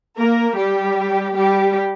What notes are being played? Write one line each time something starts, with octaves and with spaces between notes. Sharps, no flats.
A#3 A#4
G3 G4
G3 G4